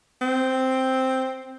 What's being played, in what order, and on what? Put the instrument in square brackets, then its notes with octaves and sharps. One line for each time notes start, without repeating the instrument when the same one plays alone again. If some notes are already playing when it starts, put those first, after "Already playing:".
[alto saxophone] C4